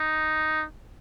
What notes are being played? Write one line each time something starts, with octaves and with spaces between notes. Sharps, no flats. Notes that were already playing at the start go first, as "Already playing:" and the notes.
Already playing: D#4